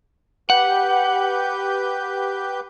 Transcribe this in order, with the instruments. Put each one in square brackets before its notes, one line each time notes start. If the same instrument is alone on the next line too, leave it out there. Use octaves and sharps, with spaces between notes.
[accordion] G4 B4 G6 [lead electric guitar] F#5